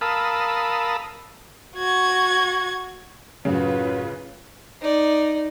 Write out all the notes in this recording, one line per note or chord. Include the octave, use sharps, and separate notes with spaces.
A#4 F5 A5 B5 D#6 E6
F#4 G#6
F#2 A2 C#3 F4 F#4 B4
D#4 D5